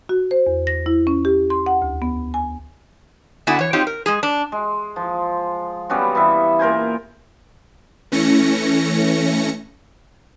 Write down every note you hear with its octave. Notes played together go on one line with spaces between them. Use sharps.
F#4
C5
E2
A#6
E4
C#4
G4
C6
F#5
D2
B3
G#5
D3 B3 E4 F#4 E5 G#5
E3 C#5
C4 D#4 F4 G4 C#5
A#4
G#3 G#4
D4
G#3
F3
G3 B3 C#4 F#4
E3 G3 E5
A#2 A#4 C5 G#5
E3 A3 C#4 A#6 C#7